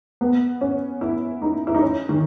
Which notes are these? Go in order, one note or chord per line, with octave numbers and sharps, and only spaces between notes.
B3
C#4
E4
D#4
E4
D#4
C#4
D#3